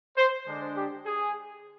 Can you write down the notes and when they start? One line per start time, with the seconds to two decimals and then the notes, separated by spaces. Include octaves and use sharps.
0.17 C5
0.46 D3 G#3 D4
0.76 G4
1.05 G#4